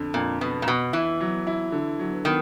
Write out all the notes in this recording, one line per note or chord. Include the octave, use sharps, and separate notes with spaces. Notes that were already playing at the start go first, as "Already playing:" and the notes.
Already playing: F2 D3
F2 A#2
B2 B3
A#2
B2 B3
E3 E4
F#3
E4
D3
F#3
D#3 B3